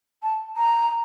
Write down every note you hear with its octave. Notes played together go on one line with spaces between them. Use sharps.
A5
A#5